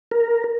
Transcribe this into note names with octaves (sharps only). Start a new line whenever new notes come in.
A#4